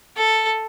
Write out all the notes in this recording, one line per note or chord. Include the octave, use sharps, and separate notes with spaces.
A4